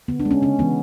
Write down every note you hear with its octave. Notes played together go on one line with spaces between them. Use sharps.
D3 B3
D4
G#3
C#4
C#3 C#4
E3 G#3 B3